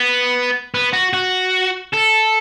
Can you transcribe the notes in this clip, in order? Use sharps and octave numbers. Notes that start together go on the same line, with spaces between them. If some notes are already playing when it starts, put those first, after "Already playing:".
Already playing: B3
B3
F#4
F#4
A4